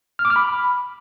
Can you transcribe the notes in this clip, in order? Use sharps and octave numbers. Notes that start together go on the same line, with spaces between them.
F6
D6
F6
B5